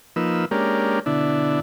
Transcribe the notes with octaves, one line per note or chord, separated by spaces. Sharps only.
F3 A#3 D#4 B4 E6
G#3 A#3 C#4 D4 G4 A#4
B2 D3 D4 E4